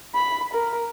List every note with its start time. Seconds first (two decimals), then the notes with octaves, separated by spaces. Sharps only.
0.15 B5
0.53 A#4